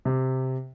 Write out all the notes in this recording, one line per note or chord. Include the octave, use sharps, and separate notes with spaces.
C3